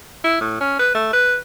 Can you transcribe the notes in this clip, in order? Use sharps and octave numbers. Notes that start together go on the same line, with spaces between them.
E4
A2
C#4
B4
A3
B4